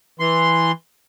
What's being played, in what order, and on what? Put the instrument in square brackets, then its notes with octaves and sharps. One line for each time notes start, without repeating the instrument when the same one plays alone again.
[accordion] E3 C6